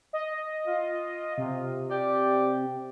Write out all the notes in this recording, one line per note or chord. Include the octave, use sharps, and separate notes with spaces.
D#5
F4
C3
G4 D5